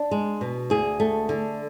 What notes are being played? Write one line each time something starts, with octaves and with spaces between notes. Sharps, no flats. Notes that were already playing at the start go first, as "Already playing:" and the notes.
Already playing: D4
G#3
B2
D2 G#4
A3
D3